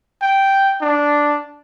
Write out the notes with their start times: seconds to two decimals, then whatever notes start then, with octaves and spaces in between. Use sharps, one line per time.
0.22 G5
0.81 D4